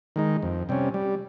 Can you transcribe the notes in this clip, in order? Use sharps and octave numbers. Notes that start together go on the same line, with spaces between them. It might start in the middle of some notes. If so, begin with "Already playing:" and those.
D#3 G#3 D#4
F2
C3 G3 C#4
G3